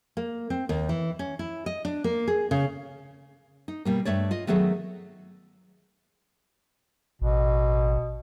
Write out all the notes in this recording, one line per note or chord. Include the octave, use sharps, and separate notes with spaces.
A#3
C4
D#2
E3
C#4
E4
D#5
D4
A#3
G#4
C#3
D#4
B2 G3 A#3
G2 A3 C#5 D5
F4 D#5
D#3 F#3 A3 B3 G#4 A4
A1 B2